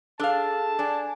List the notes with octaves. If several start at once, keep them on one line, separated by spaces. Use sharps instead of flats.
D4 G#4 A4 F5 A5 E6
D4 D5 G#5